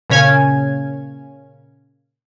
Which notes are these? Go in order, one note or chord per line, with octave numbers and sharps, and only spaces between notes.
A#2 C#3 C#4 C#5 G#5 G#6